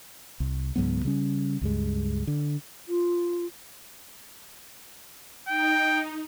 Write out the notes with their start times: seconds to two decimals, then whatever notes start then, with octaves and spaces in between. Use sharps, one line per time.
0.40 C2
0.76 C#2 G#2 F#3 B3
1.05 C#3 G3 C#4
1.61 C#2 G2 G#3
2.27 D3
2.89 F4
5.48 D#4 G5